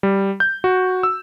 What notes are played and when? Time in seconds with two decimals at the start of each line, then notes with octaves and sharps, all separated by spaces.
0.03 G3
0.40 G6
0.64 F#4
1.03 E6